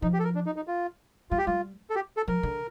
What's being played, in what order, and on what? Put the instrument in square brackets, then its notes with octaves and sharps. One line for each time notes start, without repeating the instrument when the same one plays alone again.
[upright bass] F3 [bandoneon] D#4
[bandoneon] G4
A4
A#4
D4
D#4
D#4
F4
[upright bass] G3 [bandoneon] F4
[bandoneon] G4
[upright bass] G3 [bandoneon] F4
[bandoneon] A4
G4
A4
[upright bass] F3 [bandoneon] A#4
[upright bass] D3